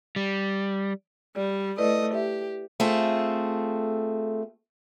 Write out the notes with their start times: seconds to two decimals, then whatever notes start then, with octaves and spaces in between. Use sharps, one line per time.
0.16 G3
1.36 G3 D5
1.78 A3 E4 B4 D5 D#5
2.15 G4 E5
2.80 A3 C4 F4 G#4 A4